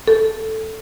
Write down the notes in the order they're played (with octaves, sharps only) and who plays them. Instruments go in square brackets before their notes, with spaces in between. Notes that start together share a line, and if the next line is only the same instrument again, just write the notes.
[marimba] A4